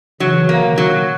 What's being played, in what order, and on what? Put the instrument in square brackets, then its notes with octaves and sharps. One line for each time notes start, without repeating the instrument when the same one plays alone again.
[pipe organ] C#3 E3 [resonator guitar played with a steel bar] F#3
[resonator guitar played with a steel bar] A#3
[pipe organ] B2 D#3
[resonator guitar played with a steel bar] F#3